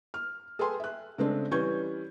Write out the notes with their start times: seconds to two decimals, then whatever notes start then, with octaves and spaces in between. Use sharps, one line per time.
0.14 F6
0.59 G#4 A4 B4 G5 G#5 C6
0.80 E5 F#6
1.18 C#3 G#3 A3 C4 D4
1.51 E3 G3 C#4 C#6 G6 G#6